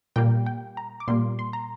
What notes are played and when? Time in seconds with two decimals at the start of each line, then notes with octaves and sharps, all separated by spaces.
0.16 A#2 G3 A#3 G5
0.46 G5
0.77 A#5
1.00 D6
1.08 A#2 G3 A#3 C6
1.39 C6
1.53 A#5